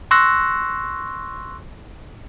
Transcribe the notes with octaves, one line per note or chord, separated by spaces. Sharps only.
C6 C#6 E6 F#6 A#6